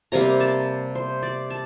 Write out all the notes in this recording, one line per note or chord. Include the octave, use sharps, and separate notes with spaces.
C3 G3 A#3 A#5
A5
C5
D5
A5